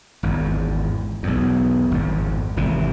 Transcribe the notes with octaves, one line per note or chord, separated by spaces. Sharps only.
G#1 E2
B1 E2
G#1 F2
G#1 C3 E3